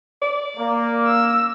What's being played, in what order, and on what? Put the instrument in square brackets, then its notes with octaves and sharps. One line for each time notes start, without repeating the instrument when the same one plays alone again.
[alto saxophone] D5
[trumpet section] A#3
[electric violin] E6